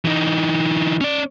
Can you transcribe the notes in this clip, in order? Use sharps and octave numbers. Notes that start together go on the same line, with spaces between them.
E3 D#4
C#4 D5